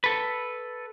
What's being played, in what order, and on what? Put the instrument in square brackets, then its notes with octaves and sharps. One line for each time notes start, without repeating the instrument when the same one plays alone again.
[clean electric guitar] A4 B4